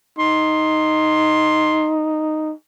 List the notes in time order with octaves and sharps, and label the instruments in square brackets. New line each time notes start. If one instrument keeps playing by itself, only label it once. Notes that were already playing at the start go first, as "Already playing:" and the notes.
[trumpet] D#4 [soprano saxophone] C6